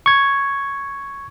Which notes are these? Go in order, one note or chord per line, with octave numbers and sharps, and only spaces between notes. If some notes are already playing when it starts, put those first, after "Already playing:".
C#6 G#6